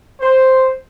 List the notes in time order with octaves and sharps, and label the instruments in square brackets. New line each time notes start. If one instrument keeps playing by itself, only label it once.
[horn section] C5